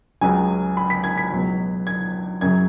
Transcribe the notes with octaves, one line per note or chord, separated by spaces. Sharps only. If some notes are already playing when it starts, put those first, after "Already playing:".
C#2 C#3 F#3 G#5
B5
B6
G#6
B6
C#2 B2 F#3
G#6
F#2 C#3 F#3 G#6